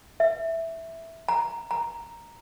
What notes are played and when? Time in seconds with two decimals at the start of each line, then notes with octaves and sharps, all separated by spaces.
0.20 E5
1.28 A#5
1.71 A#5